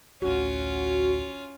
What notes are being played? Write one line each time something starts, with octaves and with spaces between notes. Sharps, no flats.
A1 D2 C#4 F4 F#4